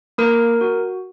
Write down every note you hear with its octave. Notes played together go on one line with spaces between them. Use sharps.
A#3 A#4
F#4